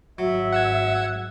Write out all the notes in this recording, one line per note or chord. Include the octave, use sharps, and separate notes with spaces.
G#1 F#3 E5
F#5 E6 G#6